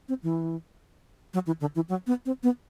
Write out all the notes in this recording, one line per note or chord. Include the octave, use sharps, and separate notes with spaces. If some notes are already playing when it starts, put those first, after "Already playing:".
C4
E3
F#3
E3
D3
E3
F#3
B3
C4
B3